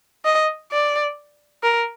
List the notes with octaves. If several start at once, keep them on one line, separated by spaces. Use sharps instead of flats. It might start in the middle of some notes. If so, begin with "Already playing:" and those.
D#5
D5
A#4